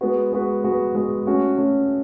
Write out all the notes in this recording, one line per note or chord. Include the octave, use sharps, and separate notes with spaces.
G#3 B3 F#4 B4
G#3 B3 F#4 B4
G#3 B3 F#4 B4
G#3 B3 F#4 B4
A3 C#4 F#4
A3 C#4 F#4